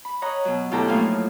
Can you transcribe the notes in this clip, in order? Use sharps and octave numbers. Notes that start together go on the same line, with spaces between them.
B5
C#5 D#5 F#5 A#5
B2 F#3
D2 B2 E4 G4 A4 A#5
A2 F3 F#3 A#3 D#4 F4